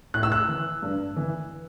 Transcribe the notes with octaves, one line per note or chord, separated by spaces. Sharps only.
A2 F#6
E6
F#6
E3
G2
E3